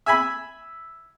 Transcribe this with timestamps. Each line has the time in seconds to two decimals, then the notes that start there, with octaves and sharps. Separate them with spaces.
0.06 E5 G#5 B5